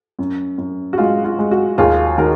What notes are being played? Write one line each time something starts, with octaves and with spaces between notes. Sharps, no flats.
F#2
F#2
F#4
G#3 F4
F4
G#3
F#4
D#2 F4 G#4
D#3 F#4 A#4